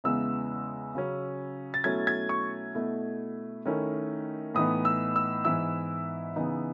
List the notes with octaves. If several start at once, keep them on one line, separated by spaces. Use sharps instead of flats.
E2 C#3 G#3 B3 E4 E6
C#3 F#3 C#4
A6
B2 F#3 A3 C#4 E4 G#6
G#6
C#6
B2 A3 E4
D#3 A3 C#4 E4
A2 E3 B3 D#4 D#6
E6
E6
G#2 E3 B3 E4 E6
C#3 E3 B3 D#4